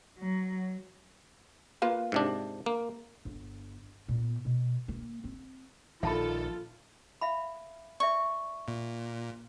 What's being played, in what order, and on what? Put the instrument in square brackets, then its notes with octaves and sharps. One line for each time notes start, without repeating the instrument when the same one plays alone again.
[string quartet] F#3
[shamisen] A#3 F4 B4
[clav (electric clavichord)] G#2 C3 D4
A#3
[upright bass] G1
A#2 B3
B2
A#3
C4
[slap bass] A#1 D#3 [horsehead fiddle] F4 [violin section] A4 [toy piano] E5 A5 B5
[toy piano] E5 F5 B5
[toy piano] D5 E5 [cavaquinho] C#6
[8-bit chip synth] A#2